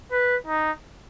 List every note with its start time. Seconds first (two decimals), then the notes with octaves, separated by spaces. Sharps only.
0.12 B4
0.47 D#4